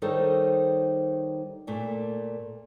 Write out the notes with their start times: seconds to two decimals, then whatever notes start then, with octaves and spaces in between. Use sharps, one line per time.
0.02 D#3 G3 D#4 A4 C5 C#5
1.67 A#2 A3 A#3